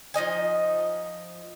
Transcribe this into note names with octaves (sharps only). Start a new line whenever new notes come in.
F3 D#4 D#5 G#5